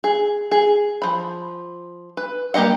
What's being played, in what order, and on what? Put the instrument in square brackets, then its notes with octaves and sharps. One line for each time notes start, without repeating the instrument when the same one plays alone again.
[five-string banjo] G#4
G#4
F3 B5
B4
G3 A#3 G4 D#5 F#5